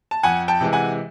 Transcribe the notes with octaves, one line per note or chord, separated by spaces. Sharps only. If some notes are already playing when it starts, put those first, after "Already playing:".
A5
F2 F#5 G#5
G5 A5
C3 E3 G#3
F#5 G#5